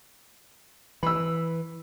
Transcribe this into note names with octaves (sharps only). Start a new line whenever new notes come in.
E3 B5 E6